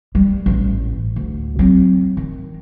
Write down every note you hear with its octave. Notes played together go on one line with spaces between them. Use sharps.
G3
A1 A2
D2
F#3 C4
D#3